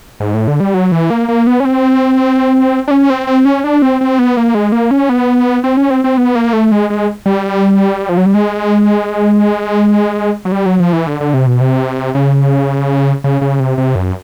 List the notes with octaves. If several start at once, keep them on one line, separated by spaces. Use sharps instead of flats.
G#2
A2
D3
G3
F#3
E3
A#3
A#3
B3
C#4
C4
D4
C#4
C4
C4
C#4
D4
C4
C4
B3
A#3
G#3
A#3
C#4
B3
C4
C#4
C4
C4
B3
A#3
A3
G#3
G#3
G3
F3
F#3
G3
G#3
F#3
G3
F#3
F3
E3
D3
D3
C3
B2
C3
C#3
C#3
C#3
C3
C3
F#2